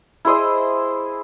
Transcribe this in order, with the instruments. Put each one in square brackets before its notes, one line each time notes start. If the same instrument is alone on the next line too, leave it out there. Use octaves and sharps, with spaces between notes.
[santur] E4 G#4 C5 D#5